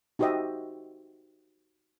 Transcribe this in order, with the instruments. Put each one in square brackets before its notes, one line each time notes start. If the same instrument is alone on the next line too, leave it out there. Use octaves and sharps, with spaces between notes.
[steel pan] D#4 F#4 G4 C5 D#5 E5